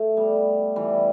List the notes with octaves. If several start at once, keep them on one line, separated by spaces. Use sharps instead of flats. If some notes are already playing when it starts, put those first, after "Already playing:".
Already playing: A3
G3 B3
E3 G3